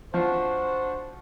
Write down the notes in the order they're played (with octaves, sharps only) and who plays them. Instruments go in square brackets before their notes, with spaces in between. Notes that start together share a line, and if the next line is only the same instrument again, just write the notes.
[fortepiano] F3 [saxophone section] D4 F#4 C5